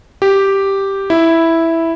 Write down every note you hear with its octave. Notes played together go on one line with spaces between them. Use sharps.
G4
E4